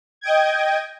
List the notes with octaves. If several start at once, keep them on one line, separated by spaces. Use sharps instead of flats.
D#5 G5 G#6